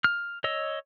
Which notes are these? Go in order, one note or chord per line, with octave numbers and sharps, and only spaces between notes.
F6
C#5 D#5 E6